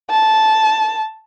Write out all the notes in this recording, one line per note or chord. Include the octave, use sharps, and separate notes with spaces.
A5